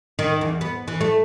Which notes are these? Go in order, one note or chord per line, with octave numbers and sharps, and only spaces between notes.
D#3
E2
B3
E3
A3